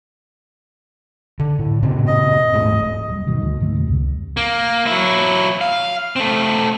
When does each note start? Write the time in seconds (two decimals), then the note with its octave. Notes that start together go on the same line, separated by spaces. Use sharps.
1.39 D3
1.59 A2
1.82 A#2 C#3 C4
2.07 D#5
2.53 D#1 G#2 A3
3.08 D#1 G3
3.26 G#2 B2 D#3
3.42 D2
3.61 G#2 D#3 G3 A3
3.73 F2 B2 D3
3.87 C#2 C3
4.37 A#3
4.86 F#3 E4
5.61 F5
6.16 A3 C4